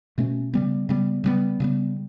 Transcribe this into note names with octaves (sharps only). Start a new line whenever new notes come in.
B2 A3 C#4
C#3 G3 B3
C#3 G3 B3
C#3 G3 B3
C#3 G3 B3